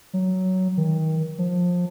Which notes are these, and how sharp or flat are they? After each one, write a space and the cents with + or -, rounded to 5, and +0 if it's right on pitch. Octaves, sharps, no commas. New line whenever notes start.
F#3 +10
D#3 +30
F3 +25